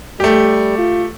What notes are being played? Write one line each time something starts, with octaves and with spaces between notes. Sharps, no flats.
G3 A3 G4
F4